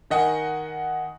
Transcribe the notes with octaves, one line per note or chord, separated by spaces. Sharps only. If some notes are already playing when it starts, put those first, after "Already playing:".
D#3 D#5 F#5 G#5